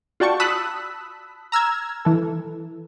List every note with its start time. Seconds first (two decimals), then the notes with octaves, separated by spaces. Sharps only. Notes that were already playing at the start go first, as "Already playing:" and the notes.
0.20 F4 F#4 D5 G5 A5 C#6
0.40 A5 B5 D#6 E6 F#6 B6
1.52 A#5 E6 F6 G#6
2.05 E3 A4